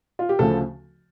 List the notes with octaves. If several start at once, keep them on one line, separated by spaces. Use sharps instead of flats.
F4
G4
D2 C#3 F3 A3 A4